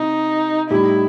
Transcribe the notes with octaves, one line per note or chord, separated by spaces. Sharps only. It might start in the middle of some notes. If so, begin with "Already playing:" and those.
Already playing: C3 D#4
A2 G3 D#4 E4 G4